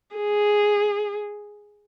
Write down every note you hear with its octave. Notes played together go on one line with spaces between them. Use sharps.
G#4